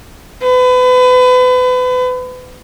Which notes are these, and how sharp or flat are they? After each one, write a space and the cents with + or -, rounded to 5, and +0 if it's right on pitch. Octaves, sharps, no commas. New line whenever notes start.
B4 +30